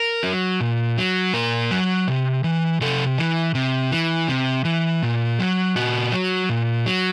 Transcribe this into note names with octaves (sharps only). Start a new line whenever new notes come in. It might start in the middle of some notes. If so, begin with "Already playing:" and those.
Already playing: A#4
F#3
A#2
F#3
A#2 A#4
F#3
C3
E3
C3 A4
E3
C3
E3
C3
E3
A#2
F#3
A#2 F#4
F#3
A#2
F#3